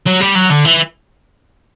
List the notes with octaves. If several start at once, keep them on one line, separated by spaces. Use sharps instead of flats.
F#3
G3
F#3
D3
E3